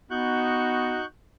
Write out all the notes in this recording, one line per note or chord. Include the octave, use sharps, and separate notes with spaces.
B3 D#4 F#4 C#6 F#6 G6